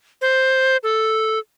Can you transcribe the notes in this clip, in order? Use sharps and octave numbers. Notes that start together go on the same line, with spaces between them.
C5
A4